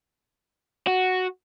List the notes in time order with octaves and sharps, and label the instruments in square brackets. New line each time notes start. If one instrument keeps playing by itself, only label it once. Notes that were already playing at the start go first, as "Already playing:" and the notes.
[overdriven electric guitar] F#4